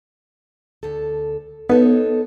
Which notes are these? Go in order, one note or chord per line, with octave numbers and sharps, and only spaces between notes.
D2 A4
B3 D#4 A4 C#5